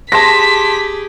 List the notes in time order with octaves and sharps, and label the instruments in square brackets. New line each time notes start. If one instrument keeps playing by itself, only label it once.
[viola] G4 G#4 [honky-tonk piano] A5 C6 A#6 [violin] B6